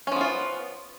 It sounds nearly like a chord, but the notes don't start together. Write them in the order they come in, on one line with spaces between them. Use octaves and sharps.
C#4 F3 B3 F4